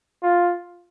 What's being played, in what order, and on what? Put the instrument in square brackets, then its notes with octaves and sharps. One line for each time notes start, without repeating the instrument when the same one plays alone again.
[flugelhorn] F4